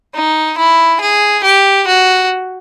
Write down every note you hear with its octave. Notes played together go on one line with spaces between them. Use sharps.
D#4
E4
G#4
G4
F#4